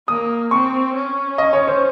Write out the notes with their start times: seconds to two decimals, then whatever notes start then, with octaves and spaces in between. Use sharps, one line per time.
0.08 A#3 D#6
0.51 C4 C#6
0.95 C#4
1.38 D#5
1.53 C#5
1.67 C5